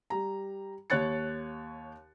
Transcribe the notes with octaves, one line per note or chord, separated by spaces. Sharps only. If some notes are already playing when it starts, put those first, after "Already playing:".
G3 A#5
D#2 C#5 F#6 A6 C#7